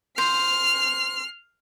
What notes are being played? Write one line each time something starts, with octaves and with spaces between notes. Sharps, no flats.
C5 F6 C7